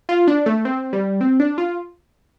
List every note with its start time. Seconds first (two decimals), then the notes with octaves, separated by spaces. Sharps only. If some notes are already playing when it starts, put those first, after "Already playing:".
0.09 F4
0.28 D4
0.46 A3
0.65 C4
0.93 G3
1.21 C4
1.40 D4
1.58 F4